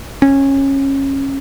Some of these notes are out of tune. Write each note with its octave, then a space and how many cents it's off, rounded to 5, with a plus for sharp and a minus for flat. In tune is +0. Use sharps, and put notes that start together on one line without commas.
C#4 -20